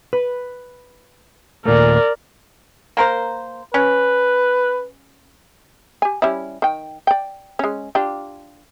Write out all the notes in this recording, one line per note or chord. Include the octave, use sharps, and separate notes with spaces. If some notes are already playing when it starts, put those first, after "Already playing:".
B4
D#2 A#2 A3 A#4 D5
A#3 A#4 C5
C#4 B4
G4 G#5
G3 C#4 E4
D#3 G5
D5 G5
G#3 C#4
D4 F4 G4